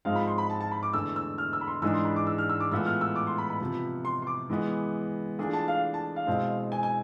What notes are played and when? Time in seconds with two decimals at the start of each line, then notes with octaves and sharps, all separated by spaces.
0.05 G#2 F3 G#3 C4 F4 F5
0.16 B5
0.28 C6
0.38 B5
0.49 A5
0.60 A5
0.71 B5
0.83 D6
0.93 E2 D3 A3 E4 E6
1.16 E6
1.38 F6
1.53 E6
1.61 B5
1.68 C6
1.82 G#2 E3 G#3 D4 G#4 E6
1.94 C6
2.05 B5
2.16 D6
2.27 E6
2.38 F6
2.49 E6
2.60 D6
2.72 A2 E3 G#3 B3 F4 E6
2.86 F6
3.01 E6
3.16 D6
3.27 C6
3.38 B5
3.50 B5
3.60 C3 F3 B3
4.05 C6
4.22 C6
4.27 D6
4.50 E3 G#3 B3
5.39 E3 A3 D4 F4 G#4
5.53 A5
5.68 F5
5.94 A5
6.16 F5
6.27 B2 G#3 C4 E4
6.72 G#5
6.83 G#5